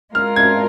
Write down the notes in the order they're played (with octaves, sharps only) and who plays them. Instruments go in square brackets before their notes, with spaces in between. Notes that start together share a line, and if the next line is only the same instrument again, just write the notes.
[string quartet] G#3 F4 A#4 [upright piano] F6
[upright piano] G#6